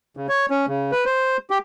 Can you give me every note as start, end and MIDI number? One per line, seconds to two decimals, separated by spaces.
0.17 0.27 49
0.29 0.46 73
0.50 0.66 61
0.68 0.91 49
0.92 1.05 71
1.05 1.37 72
1.50 1.58 67